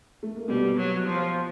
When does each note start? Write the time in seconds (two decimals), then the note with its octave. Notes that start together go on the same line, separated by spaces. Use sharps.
0.23 A3
0.36 A#3
0.48 B2 G3 B3
0.77 F#3
1.06 F3